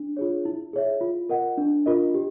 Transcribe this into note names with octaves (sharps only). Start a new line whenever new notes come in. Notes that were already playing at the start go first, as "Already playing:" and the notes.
Already playing: D4
F4 G#4 C#5
E4
G#4 C#5 E5
F4
A#4 D#5 F#5
D4
F4 A#4 D#5
G4